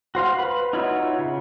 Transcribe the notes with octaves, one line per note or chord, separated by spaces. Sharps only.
F#4 C5 F5
B4 B5
D#4 F4 F#4 C#5 E5
C#3